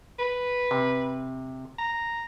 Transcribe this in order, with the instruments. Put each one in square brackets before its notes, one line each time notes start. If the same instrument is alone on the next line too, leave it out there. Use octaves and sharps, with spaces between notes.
[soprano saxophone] B4
[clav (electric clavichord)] C3
[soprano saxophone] A#5